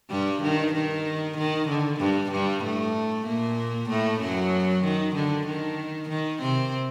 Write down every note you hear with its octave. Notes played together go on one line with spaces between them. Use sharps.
G2 G3
D#3
D#3
D#3
D3
G2 G3
G2 G3
A2 A3
A#2 A#3
A2 A3
F#2 F#3
D#3
D3
D#3
D#3
C3 C4